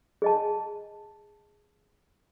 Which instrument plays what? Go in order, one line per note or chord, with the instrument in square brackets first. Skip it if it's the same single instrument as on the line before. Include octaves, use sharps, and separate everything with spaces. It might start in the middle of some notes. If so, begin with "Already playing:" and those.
[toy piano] G#4 D#5 A5